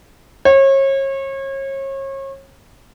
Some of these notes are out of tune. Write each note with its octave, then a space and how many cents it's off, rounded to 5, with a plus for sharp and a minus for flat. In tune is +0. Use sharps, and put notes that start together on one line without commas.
C#5 -35